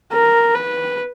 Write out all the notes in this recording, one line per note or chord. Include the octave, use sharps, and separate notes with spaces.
A#4
B4